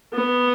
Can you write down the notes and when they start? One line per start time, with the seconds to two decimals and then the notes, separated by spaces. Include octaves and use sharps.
0.14 B3